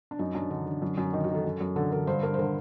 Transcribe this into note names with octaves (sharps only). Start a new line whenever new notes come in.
D4
F#2 D#4
F#2 D4
D3 D#4
D3
F#2
F#2
D#3 D#4
F#4
D#3
A4
F#2
F#2
D3 A4
D3 A#4
G2 C5
G2 A#4
C5
D3 A#4